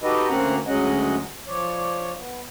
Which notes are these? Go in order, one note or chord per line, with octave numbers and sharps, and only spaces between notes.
D#4 F#4 G4 A4 B4 D#5
D2 A#3 C4 C#4 F#5 A#5
D2 F#3 G#3 C#4 D#5 F#5
F3 C#5 D5
B3